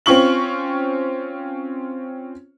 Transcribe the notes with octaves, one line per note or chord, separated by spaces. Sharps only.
C4 C#4 F4 C#6 F#7